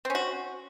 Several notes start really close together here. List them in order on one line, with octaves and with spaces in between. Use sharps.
C4 C#4 F#4